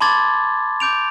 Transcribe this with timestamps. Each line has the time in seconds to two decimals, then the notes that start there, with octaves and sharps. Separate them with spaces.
0.01 A5 B5 C6 D6 G#6 A6
0.80 D6 G6 D7 F7